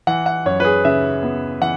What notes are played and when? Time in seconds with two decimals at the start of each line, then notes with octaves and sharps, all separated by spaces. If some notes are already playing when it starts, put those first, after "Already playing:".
0.07 E3 F#5
0.26 F#5
0.46 F#2 C#5
0.60 B4
0.64 G#4
0.85 C#3 E5
1.23 B3
1.61 E3 F#5